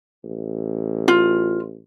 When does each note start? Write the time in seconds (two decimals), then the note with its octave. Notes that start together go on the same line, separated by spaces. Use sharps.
0.24 A1
1.08 F4